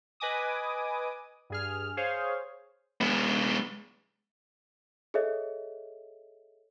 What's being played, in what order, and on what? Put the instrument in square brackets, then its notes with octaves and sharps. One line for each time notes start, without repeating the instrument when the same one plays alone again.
[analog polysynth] B4 D#5 G#5 D6 D#6
G2 G#4 F6
G#4 C5 C#5 F5
[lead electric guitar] G#3 B3
[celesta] G#4 A4 C#5 D#5 E5